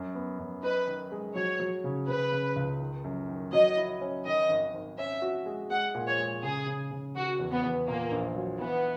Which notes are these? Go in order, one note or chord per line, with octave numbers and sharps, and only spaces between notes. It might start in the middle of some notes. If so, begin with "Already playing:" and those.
Already playing: F#2
B3
F#2
D#4 B4
D#3
G#3
F#3 C#5
F#3
C#3
C#3 B4
C#3
C#2
D#3
F#2
D#3
F#3 D#5
E4
C#4
D#3 D#5
G#1
G#1
C#4 E5
F#4
G#3
G#3 F#5
A#2
C#5
G#3
C#3 G#4
C#3
C#3
D#3 F#4
E2
B3
E2
A#2 A#3
A#1
F#3
E3 B3